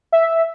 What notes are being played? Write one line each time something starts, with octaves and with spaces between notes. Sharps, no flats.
E5